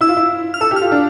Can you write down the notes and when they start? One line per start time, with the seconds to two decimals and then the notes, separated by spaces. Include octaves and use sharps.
0.01 E4 E6
0.08 F4
0.17 E4
0.54 F6
0.61 A4 E6
0.71 G4
0.76 F6
0.81 F4
0.92 D4